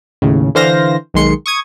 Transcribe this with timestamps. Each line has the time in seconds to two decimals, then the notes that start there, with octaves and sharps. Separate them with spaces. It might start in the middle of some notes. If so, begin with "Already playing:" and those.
0.22 D#2 A2 C#3
0.55 D3 E3 C5 F5 A#6
1.14 B1 D#3 G#3 C6 C#7
1.46 C#6 D#6 G#6